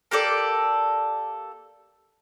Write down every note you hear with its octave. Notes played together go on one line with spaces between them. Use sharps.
A#3 G4 A4 D5